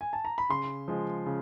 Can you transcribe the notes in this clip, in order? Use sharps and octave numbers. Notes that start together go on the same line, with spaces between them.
G#5
A5
A#5
B5
C#3 C6
F3 G#3
C#3